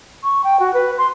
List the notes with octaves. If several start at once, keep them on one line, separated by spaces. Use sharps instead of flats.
C#6
G5
F#4
B4
C6